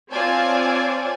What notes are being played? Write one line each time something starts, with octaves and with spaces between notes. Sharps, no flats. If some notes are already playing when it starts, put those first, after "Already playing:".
C4 F4 C#5 D5 G#5 A5